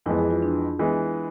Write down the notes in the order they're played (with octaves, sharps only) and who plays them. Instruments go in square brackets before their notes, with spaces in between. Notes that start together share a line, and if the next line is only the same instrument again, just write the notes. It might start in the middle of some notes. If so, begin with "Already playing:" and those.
[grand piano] F2 E3 G#3 B3 [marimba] E4
[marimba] G#4
F4
D4
[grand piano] E3 G#3 B3